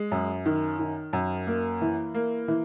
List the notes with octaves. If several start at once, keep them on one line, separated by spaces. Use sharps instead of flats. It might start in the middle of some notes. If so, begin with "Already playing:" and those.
Already playing: G#3
F#2
D#3
D#3
F#2
A#3
E3
A#3
E3